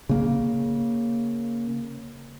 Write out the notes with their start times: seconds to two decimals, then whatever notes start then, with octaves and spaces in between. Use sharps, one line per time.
0.09 C#3 A#3